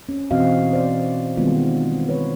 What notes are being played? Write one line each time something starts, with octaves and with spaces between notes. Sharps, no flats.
C#4
B2 E3 C4 F#4 D#5 F5
C5 D5
D#3 G3 G#3 B3 C4 F4
B4 C#5